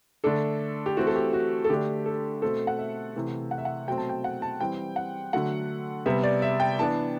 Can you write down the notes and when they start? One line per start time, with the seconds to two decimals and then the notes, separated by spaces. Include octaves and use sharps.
0.24 D3 A3 D4 A4
0.86 G4
0.97 E3 A3 C4 F#4
1.07 A4
1.16 G4
1.33 F#4
1.64 A4
1.69 D3 A3 D4 G4
2.06 A4
2.42 B2 A3 C4 A4
2.67 F#5
2.79 E5
3.15 C3 E3 A3
3.51 F#5
3.58 E5
3.65 F#5
3.88 B2 F#3 A3 C4 G5
3.98 A5
4.09 G5
4.24 F#5
4.42 A5
4.61 E3 G3 C4 G5
4.96 F#5
5.33 D3 F#3 A3 F#5
6.06 C3 G3 B3 E5
6.24 D5
6.42 E5
6.60 G5
6.79 E3 B3 D4 A5